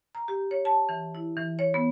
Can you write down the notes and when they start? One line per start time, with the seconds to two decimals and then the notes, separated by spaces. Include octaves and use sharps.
0.15 A#5
0.28 G4
0.51 C#5
0.65 A5
0.89 E3
1.15 E4
1.37 E3
1.59 C#5
1.74 B3